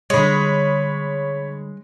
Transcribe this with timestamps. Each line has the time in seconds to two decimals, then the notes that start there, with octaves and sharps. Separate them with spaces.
0.10 D3 G3 G#3 C#5 B5